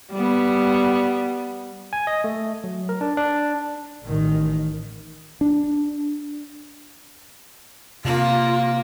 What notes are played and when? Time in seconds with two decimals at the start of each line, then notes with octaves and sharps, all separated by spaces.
0.12 G3 B3
1.93 G#5
2.07 D#5
2.24 A3
2.64 F#3
2.89 A#4
3.01 D4
3.17 D4
4.04 A1 D#3
5.41 D4
8.05 C3 A#3 F4